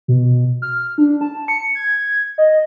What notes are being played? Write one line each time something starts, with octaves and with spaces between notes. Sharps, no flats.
B2
F6
D4
A5
C#7
G#6
D#5